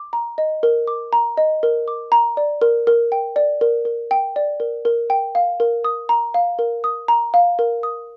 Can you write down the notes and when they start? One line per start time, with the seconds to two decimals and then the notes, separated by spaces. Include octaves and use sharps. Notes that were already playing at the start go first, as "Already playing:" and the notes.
Already playing: D6
0.13 A#5
0.38 D#5
0.63 A#4
0.87 D6
1.13 A#5
1.37 D#5
1.63 A#4
1.88 D6
2.12 A#5
2.37 D5
2.62 A#4
2.87 A#4
3.12 G5
3.36 D5
3.61 A#4
3.85 A#4
4.11 G5
4.36 D5
4.60 A#4
4.85 A#4
5.10 G5
5.35 F5
5.60 A#4
5.84 D#6
6.09 A#5
6.34 F5
6.59 A#4
6.84 D#6
7.08 A#5
7.34 F5
7.59 A#4
7.83 D#6